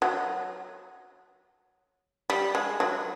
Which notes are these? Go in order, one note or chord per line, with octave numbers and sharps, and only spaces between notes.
F#3
G3
G#3
F#3